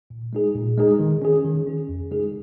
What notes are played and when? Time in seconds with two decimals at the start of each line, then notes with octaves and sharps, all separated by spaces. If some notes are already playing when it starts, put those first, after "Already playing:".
0.10 A#2
0.33 G#3 D#4 G#4
0.55 A#2
0.78 G#3 D#4 G#4
1.00 D#3
1.22 C#4 G#4
1.44 D#3
1.67 C#4 G#4
1.89 F2
2.11 C#3 G#3 D#4 G#4